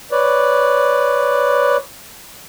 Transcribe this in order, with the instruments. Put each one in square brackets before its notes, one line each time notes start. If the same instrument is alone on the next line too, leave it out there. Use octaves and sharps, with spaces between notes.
[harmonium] B4 C#5 D5